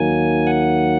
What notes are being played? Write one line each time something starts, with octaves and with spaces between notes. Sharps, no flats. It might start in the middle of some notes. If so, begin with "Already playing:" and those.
Already playing: D#2 D#3 F#3 A#3 G#5
F#5